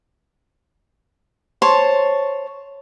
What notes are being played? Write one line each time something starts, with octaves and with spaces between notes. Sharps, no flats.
C5 C#5 A5